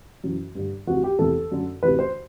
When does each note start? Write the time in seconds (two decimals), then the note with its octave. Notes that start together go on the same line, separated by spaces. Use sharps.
0.24 F#2 E3
0.55 G2 D3
0.87 D2 C3 E3 F#4
1.04 G4
1.19 E2 C3 E3 A4
1.51 F#2 D3
1.83 D2 C3 E3 B4
1.99 C5